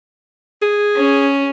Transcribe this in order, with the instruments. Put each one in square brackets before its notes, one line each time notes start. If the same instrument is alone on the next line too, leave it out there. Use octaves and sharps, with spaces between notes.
[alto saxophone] G#4
[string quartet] C#4